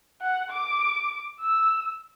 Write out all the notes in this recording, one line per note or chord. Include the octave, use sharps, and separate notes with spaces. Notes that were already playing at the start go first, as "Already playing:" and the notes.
F#5
D6
E6